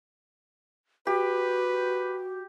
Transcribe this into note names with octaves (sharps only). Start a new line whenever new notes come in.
F#4 G4 B4